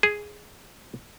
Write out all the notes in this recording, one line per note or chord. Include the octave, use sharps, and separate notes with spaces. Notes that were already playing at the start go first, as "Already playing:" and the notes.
G#4